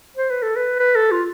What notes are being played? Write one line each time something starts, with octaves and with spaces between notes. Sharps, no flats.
C5
B4
A4
B4
B4
A4
F4